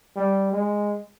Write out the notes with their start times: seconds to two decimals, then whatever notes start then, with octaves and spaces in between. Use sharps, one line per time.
0.16 G3
0.53 G#3